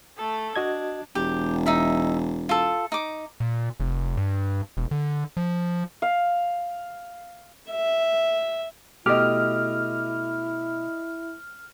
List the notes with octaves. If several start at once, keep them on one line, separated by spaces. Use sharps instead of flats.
A3 A4
D4 F#4 D#5 G#6
E1 G4
D#4 E5
F4 A4
D#4 D6
A#2
F1
G2
E1
D3
F3
F5
E5
B2 A3 E4 G4 D#5 D6 F6